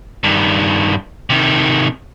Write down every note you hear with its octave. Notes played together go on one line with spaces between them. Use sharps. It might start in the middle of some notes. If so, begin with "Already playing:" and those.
G2 D#3
C3 D#3